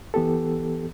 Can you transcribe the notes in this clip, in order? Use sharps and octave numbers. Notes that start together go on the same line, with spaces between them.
E3 B3 G4 A4